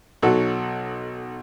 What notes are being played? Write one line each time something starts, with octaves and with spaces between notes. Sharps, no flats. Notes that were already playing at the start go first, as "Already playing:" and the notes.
B1 F#3 D#4 A4